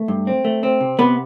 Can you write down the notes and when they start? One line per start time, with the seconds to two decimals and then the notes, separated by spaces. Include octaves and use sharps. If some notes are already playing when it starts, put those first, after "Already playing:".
Already playing: A3
0.08 G2
0.27 C4
0.44 A3
0.63 C4
0.81 C3
0.99 C3 B3 B4